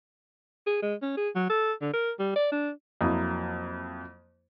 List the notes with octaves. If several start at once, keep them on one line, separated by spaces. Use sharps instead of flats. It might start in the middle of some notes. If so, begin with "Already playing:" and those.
G#4
G#3
C#4
G#4
F#3
A4
D3
A#4
G3
D5
D4
F2 F#3 A#3 E4 D#6